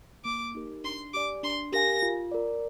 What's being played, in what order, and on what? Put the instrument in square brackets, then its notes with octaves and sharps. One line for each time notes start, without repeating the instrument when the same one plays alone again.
[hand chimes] A#3 [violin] D6
[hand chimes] D#4 G4 A#4
[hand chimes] D4 [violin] C6
[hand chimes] G4 D5 G#5 [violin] D6
[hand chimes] D4 [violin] C6
[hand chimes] G4 A#4 F5 G#5 [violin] A#6
[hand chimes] F4
A#4 D5